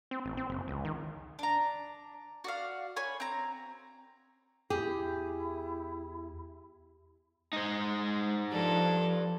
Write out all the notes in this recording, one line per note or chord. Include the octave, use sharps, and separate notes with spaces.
C4
A1
C4
F#1
C#2
D#3
D4 A#5
F#4 D5 F5
C#5 G#5 B5
C4 A#5
E2 E4 G4 G#4
G#3 D#4 C5
F3 G3 D4 A4